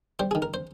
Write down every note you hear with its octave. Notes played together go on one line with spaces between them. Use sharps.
G3 C5
D#3 G#4
A#4
C5